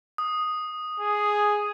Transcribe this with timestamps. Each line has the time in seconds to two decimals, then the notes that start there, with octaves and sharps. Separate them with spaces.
0.18 D#6
1.00 G#4